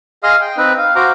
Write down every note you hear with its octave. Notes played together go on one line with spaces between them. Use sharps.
G#4 D#5 F5 C6 D#6 F6
G5
C4 D#4 B4
F5
F#4 C5 F5 A#5 D6